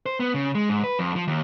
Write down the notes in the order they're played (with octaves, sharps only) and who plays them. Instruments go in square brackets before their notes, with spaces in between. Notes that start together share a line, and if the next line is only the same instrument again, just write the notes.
[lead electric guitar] C5
B3
C#3
G#3
G#2
B4
F2
F3
D#2